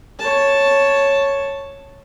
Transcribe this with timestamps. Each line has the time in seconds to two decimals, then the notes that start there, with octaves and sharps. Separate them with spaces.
0.19 C#5 A5